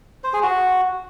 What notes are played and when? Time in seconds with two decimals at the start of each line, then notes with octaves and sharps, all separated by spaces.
0.24 C5
0.33 G#4
0.43 F#4